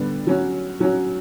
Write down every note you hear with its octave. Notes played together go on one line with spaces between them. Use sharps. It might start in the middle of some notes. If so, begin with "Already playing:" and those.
Already playing: D3 G3 B3
F#3 C#4 F#4
F#3 C#4 F#4